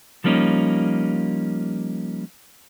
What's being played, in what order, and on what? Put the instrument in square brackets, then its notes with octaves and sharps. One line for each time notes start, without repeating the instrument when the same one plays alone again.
[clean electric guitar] F3 G3 A#3 C#4 D#4